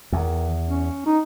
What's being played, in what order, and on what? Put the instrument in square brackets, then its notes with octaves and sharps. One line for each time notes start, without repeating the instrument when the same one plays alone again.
[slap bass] E2 [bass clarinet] D#3
[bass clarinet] C#4
D#4